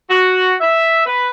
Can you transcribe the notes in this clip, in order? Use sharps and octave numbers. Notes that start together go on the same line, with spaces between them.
F#4
E5
B4